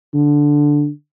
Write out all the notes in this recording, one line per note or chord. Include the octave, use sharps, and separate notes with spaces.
D3